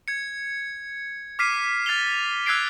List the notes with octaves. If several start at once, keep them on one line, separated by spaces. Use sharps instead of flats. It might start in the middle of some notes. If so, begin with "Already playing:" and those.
G#6 C#7
D6 F6 B6 C7 D#7
F6 A6 C7 F7 G7
E6 F#6 G#6 B6 C7 D7